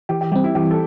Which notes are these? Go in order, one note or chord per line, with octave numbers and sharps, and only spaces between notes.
E3 G4
G4
G3 C4 G4
E4
E3 G4
A4